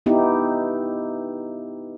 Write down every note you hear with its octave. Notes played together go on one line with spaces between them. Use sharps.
B3 D#4 E4 G4